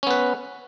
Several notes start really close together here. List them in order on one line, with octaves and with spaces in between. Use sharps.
C#4 B3 B4